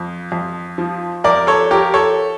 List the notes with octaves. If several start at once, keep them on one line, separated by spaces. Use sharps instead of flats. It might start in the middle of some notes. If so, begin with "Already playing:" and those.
Already playing: F2
F2
F3
F2 A#4 D5
A4 C#5
F3 G4 A#4
A4 C#5